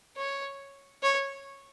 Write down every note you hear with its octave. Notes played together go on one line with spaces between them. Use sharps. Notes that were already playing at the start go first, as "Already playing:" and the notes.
C#5
C#5